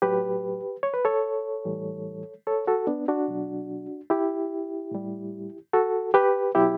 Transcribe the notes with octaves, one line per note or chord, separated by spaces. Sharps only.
A2 F#3 G4 B4
C#5
B4
A4 C#5
A2 E3 G3
A4 C#5
F#4 A4
B3 D4
D4 F#4
B2 F#3
E4 G4
A2 G3
F#4 A4
G4 B4
B2 F#3 E4 G4